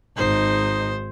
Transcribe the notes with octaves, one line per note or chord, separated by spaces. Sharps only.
G#1 D#4 C5